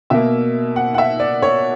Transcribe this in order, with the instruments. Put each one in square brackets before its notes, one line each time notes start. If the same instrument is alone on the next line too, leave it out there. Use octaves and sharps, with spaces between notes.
[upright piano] B2 A#3 E5
F#5
F#5
E5
D5
C#5